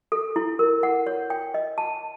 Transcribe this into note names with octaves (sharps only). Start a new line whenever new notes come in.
A4
E4
A#4
F#5
C#5
G5
D#5
A5